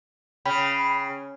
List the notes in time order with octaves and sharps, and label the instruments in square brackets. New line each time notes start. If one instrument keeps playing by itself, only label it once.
[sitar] C#3 [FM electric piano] G5 B5